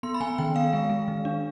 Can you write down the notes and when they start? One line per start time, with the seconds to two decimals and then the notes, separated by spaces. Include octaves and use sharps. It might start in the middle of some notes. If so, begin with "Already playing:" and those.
0.03 B3 C6
0.14 B5
0.21 B3 G#5
0.38 D#3 G5
0.55 B3 F5
0.73 G#3
0.90 G#3
1.08 D#3
1.25 D4